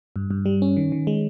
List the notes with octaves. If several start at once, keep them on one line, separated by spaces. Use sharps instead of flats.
G2
G2
G3
C#4
D#3
D#3
G#3